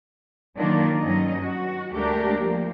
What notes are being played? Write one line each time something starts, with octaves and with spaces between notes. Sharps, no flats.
D#3 F#3 A#3 D4 F4
G2 F#3 C#4 D#4 D#5
F#4
D2 G#3 A3 D4 G4 A#4
F3 A#3